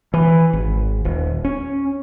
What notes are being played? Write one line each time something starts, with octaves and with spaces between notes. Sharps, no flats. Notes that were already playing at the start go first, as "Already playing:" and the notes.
E3
G#1
D#1
C#4